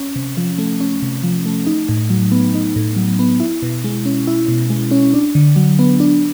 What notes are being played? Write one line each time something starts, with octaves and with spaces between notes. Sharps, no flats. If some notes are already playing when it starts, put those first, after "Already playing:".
Already playing: C#4
C3
F3
A3
C#4
C3
F3
A3
D#4
A2
F#3
B3
D#4
A2
F#3
B3
E4
B2
G#3
C#4
E4
B2
G#3
C#4
D4
D3
F#3
B3
D4